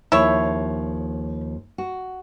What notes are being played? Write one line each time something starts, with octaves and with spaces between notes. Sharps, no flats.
D#2 F3 E4 C#5
F#4